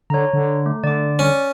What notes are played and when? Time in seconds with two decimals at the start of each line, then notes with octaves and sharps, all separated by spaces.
0.10 D3 C#5 A#5
0.33 D3
0.66 A3
0.84 D3 D5 D6
1.19 C#4